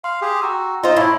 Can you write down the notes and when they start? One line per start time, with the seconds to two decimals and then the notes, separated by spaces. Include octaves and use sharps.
0.04 F5 C6
0.21 G4 G#4
0.42 F#4 G5 A#5 E6
0.83 D#4 F4 C5
0.96 A2 E4 C#5